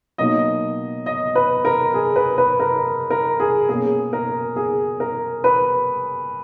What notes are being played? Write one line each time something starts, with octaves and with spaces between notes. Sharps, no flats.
B2 F#3 A#3 D#4 D#5
D#5
B4
A#4
G#4
B4
B4
A#4
A#4
G#4
B2 A#3 C#4 G#4
A#4
G#4
A#4
B4